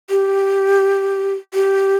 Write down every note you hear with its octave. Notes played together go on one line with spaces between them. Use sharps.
G4
G4